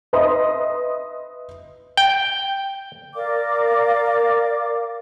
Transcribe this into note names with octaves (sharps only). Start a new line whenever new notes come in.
B4 D#5 E5 C6 D#6
G5
A#4 D5 F5 D6